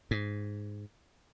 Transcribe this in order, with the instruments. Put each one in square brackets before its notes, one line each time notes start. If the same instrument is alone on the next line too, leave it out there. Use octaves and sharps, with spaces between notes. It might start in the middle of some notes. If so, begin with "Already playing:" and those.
[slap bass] G#2